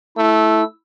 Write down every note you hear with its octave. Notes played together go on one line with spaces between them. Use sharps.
A3 E4 E6